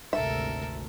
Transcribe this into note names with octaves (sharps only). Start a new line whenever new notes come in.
G#1 D2 C3 A4 A#4 E5